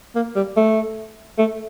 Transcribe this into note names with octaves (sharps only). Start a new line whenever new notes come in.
A#3
G3
A3
A3